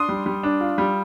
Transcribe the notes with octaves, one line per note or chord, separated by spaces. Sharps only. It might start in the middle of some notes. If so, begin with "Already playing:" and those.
Already playing: D4 C6 D#6
G3
G3
D4
F4
G3